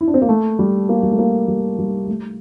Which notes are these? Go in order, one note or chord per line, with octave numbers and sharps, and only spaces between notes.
E4
D4
C4
A#3
A3
G3
A#3
G3
A3
A#3
G3
G3
A3